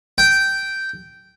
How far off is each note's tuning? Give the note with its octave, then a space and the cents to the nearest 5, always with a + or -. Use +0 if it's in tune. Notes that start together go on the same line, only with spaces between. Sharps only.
G5 -10